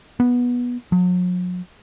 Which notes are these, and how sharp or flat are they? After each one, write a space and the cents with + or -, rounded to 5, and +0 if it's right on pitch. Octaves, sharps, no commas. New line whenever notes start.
B3 -15
F#3 -45